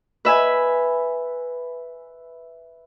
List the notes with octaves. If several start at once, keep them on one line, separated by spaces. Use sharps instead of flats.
B4 E5 G#5